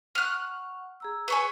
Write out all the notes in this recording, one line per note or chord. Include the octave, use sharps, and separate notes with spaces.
F#5 C#6 F6 F#6
G#4 A#5 E6
B4 C#5 G#5